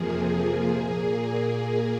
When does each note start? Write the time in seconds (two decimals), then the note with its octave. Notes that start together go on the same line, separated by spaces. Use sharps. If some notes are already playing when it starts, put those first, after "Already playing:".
Already playing: F2 C3 F3 A#3 G#4
0.14 G#4
0.70 A#2 A#3 G#4